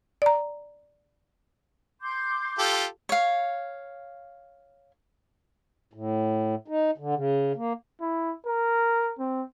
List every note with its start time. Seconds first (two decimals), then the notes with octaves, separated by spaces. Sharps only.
0.22 D5 A#5
2.01 C6 D6 G6
2.59 F4 G4 A4
3.09 C#5 F5
5.94 A2
6.68 D#4
6.98 D3
7.15 C#3
7.56 A#3
8.01 E4
8.46 A#4
9.19 C4